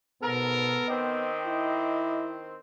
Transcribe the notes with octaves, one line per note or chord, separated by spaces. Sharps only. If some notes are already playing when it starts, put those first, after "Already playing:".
G#2 B2 B3 A4 A#4
D#3 C4 D#5 G5 D6
E4